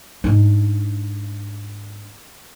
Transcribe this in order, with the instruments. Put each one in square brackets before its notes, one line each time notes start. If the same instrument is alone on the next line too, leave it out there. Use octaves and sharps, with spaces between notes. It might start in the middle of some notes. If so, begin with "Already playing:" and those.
[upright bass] G#2 D4